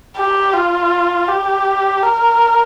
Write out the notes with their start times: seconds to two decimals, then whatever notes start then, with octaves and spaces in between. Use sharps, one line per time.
0.17 G4
0.54 F4
1.28 G4
2.02 A#4